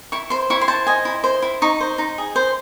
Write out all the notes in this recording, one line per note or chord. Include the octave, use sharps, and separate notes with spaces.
E4 C#6
C5 C6
E4 C#6
C6
C5 A5
D#5 G#5
E4
C5
E4
D#4 C#6
C5
D#4
G#4
C5